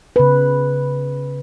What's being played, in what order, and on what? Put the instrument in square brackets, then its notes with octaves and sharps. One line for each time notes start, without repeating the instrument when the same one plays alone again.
[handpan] C#3 B4